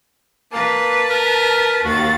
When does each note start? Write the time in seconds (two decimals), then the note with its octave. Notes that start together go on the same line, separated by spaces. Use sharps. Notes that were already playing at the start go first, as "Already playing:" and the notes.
0.52 A#3 B4 A5
1.10 A#4
1.85 D#2 F#4 A6